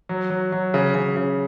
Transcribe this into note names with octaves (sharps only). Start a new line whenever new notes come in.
F#3
F#3
F#3
C#3
C#3
C#3